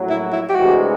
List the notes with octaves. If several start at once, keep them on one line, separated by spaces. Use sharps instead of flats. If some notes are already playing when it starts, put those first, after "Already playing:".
Already playing: A#1 A2 F#3
E4
E4
G4
D2 C3 E3 G#3 F#4